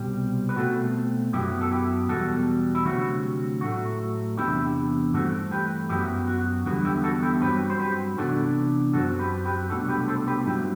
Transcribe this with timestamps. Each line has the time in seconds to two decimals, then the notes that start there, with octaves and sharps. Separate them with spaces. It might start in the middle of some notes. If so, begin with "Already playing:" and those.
Already playing: C2 B2 G3 C4
0.49 B4
0.56 B2 A3 C4 F#4 A4
1.33 F#2 F#3 B3 E4 G4
1.61 A4
1.71 E4 G4
2.09 E2 B2 G3 F#4 A4
2.75 E4
2.85 D2 C3 F#3 C4 F#4
3.61 A2 F#3 A3 F#4
4.37 E2 C3 E3 B3 D4 E4 G4
5.14 G2 E3 A3 C4 F#4 A4
5.51 G4 B4
5.89 F#2 F#3 B3 E4 G4
6.27 F#4
6.65 E2 D3 G3 B3 F#4
6.85 E4 G4
7.04 F#4 A4
7.23 E4 G4
7.41 G2 F#3 C4 G4 B4
7.70 C5
7.80 G4 B4
8.18 C3 E3 B3 D4 F#4 A4
8.93 F#2 F#3 C4 F#4 A4
9.19 G4 B4
9.45 G4 B4
9.69 C2 B2 A3 D4 F#4 A4
9.88 G4 B4
10.08 A4 C5
10.27 G4 B4
10.46 G2 F#3 C4 E4 G4